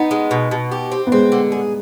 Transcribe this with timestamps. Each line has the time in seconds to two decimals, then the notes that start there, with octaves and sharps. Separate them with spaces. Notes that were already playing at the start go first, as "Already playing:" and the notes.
Already playing: B3 D#4
0.11 G#3
0.31 B2
0.51 B2
0.72 G4
0.91 C4
1.07 B3
1.12 G#3 C4
1.32 D3
1.52 G#4